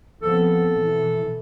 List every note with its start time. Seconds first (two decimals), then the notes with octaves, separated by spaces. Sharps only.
0.22 F3 B3 C4 A4
0.72 B2 E3